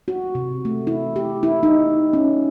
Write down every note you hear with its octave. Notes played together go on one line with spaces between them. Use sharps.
F#4
C3
A3
E4
G4
E4
D#4
C#4